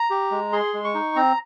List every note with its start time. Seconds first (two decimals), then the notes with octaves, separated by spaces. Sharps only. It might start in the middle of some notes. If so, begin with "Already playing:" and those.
Already playing: A#5
0.10 G4
0.31 G#3
0.52 G#4 C6
0.74 G#3
0.84 C#6
0.94 D#4
1.16 C4 A#5